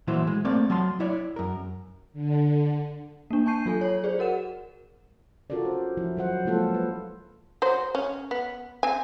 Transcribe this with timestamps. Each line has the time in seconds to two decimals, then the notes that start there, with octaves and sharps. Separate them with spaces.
0.07 A#2 E3 F#3 E4 C5
0.27 G#3
0.45 A3 A#3 C4 D5
0.70 F#3 A5 C6
1.00 E4 C#5 D5
1.36 F#2 A#4
2.13 D3
3.31 A#3 D4
3.46 G#5 A5 C#6 G6 C7 D#7
3.66 F#3 F4 A4 G#5
3.81 C#5
4.04 G#4 C5 D5
4.19 F#4 A#4 F#5 E7
5.50 C#4 F4 F#4 A4 A#4 D5
5.65 C5
5.97 F3 E4
6.17 F#3 C5 F#5
6.45 F3 G#3 A#3 F4 A4 C5
6.74 B4
7.62 F#3 C5
7.95 C#4
8.31 B3
8.83 C4 G#5